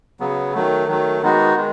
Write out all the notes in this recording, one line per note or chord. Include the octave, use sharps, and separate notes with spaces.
C#3 F#3 B3
D#3 F#3 A3
D#3 F#3 A3
D#3 G#3 B3 D#4 F#4
D#3 G#3